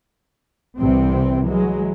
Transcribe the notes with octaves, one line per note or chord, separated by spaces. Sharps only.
C2 C3 E3 C4
E3 F#3 G#3